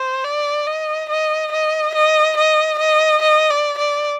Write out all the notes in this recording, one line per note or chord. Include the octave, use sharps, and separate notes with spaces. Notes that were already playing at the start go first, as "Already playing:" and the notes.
Already playing: C5
D5
D#5
D#5
D#5
D#5
D#5
D#5
D#5
D5
D5